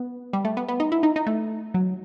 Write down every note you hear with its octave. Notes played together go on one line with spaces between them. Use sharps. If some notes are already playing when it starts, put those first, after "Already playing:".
Already playing: B3
G3
A3
B3
B3
D#4
E4
D#4
D#4
A3
F#3